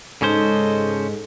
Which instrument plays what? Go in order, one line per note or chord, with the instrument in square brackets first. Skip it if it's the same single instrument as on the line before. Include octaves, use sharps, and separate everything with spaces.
[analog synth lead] G#2 [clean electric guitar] C#3 C#4 C5 [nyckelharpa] A4 D#5